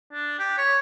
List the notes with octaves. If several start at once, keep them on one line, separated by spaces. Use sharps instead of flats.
D4
G4
C#5